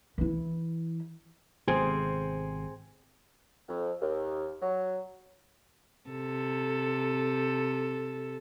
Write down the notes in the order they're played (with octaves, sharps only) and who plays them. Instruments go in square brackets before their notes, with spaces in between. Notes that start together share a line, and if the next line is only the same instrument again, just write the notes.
[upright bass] E3 E4
[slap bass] G#1 C3 [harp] C4 G#4
[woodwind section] F2
D#2
F#3
[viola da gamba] C3 A4